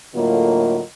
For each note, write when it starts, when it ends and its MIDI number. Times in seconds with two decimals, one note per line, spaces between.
0.15 0.81 45
0.15 0.81 50
0.15 0.81 54
0.15 0.81 58
0.15 0.81 65
0.15 0.81 75